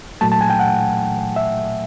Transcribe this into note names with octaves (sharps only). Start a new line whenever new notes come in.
A#2 F#3 A3 A5
A5
G#5
G5
F#5
E5